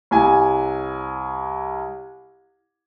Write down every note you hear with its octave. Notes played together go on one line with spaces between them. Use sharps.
C2 G#5